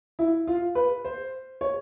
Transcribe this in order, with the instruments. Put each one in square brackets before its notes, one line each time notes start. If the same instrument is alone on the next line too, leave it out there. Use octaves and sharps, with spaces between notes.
[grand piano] E4
F4
B4
C5
C#5